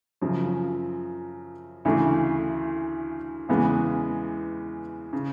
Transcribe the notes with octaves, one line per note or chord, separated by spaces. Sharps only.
F#2 C#3 F3
D2 C#3 E3 A3
E2 C#3 E3 G#3 B3
C#3